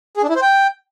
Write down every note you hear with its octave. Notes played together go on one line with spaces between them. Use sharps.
G#4
D4
E4
C5
G5